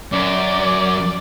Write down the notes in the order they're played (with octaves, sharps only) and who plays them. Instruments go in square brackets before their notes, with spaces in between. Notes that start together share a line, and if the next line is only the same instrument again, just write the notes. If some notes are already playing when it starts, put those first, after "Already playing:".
[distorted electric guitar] F#2 [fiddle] D5